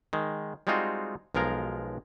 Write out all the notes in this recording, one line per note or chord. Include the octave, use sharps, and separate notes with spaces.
D#3 G#3
G3 G#3 C4 D#4 F4 F#4
B1 F3 G#3 A#4 A#5